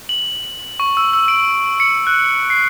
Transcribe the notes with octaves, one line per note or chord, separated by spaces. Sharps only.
F#7
C#6
E6
E6
D7
C#7
F#6
C7